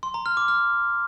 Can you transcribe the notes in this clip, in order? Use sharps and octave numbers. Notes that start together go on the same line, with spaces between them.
C6
A#5
F6
D6
F6